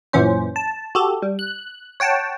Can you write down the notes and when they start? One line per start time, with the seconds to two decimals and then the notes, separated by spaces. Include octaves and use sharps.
0.13 F#2 A#2 E3 C#4 C5
0.56 A5
0.95 F#4 G4 A4
1.22 G3
1.39 F#6
2.00 C#5 F#5 G5 A5